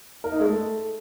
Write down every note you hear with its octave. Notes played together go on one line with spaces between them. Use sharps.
A#4
D#4
G#3
A3